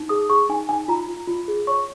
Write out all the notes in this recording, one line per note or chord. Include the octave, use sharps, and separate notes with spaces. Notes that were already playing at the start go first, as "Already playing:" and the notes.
Already playing: D#4
G#4 D#6
G#4 C#6
D#4 G#5
D#4 G#5
F4 A#5
F4
F4
G#4
C#5 C#6